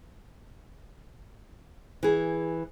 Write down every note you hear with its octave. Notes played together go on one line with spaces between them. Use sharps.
E3 G#4